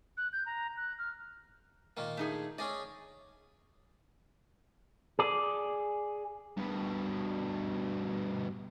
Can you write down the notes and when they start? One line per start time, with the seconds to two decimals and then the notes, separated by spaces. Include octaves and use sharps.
0.17 F#6
0.33 G6
0.46 A#5
0.77 F#6
0.98 F6
1.97 A#2 D#3 A#3
2.17 A3 D#4 G#4
2.58 C#4 G#4 D5 D#5
5.19 G#4 D5
6.57 G2 B2